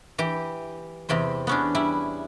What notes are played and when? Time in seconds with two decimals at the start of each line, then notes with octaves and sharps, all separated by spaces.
0.18 E3 G4
1.09 E2 C3 G4 C5
1.47 B3 C#4 D4
1.75 G3 E4